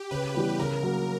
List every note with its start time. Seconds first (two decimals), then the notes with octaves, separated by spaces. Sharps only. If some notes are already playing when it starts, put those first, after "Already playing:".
Already playing: G4
0.11 C#3 B4
0.34 E3 G3 B3
0.59 C#3 A#4
0.83 F#3 A#3